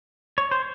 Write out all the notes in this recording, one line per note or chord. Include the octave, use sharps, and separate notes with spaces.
C#5
C5